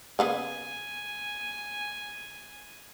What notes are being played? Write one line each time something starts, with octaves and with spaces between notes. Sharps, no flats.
C#3 A#3 B3 G#5